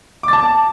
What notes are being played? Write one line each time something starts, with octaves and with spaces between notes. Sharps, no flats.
A5 D6 A6